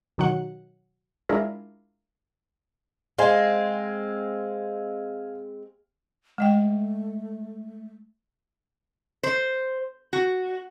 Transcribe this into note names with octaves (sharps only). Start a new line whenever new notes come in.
B2 D#3 F#3 F#5
G#3 D4 E4 F4 G#4 A#4
G#3 C4 F5 G#5
G#3 A3 D#5 G5
C5
F#4